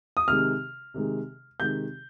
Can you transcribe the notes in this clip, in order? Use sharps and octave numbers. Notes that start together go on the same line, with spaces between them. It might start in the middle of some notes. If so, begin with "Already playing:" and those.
D#6
C3 D#3 G#3 F6
C3 D#3 G#3
C3 D#3 G#3 G6